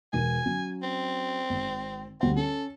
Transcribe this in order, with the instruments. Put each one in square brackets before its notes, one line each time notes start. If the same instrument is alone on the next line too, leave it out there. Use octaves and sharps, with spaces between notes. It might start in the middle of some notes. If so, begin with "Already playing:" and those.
[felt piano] E1 A#4 D#7 [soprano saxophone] G#5
[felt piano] F#3 C#4
[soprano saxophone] C4
[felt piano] G#1
[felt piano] D2 G3 F#5 [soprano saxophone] C4
[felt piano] C#4 [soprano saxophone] A4